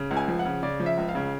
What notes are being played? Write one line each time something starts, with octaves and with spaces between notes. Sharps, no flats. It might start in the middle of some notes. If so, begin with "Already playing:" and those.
Already playing: C#3
C#2
G#5
F3
F#5
C#3
C#3 D5
F3
E5
C#2
F5
C#3